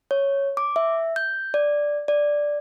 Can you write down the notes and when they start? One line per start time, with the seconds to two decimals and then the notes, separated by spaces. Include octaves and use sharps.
0.11 C#5
0.57 D6
0.76 E5
1.16 G6
1.54 D5
2.08 D5